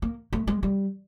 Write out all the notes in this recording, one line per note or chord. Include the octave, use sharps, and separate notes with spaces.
A#3
A3
G#3
G3